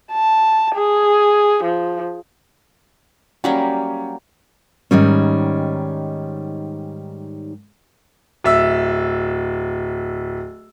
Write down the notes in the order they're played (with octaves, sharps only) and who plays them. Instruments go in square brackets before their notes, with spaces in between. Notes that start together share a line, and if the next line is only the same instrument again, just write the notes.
[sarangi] A5
G#4
F3
[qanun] F#3 G3 A#3 [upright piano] C#4
[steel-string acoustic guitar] G#2 D#3 G3 C#4
[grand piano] D1 E5 E6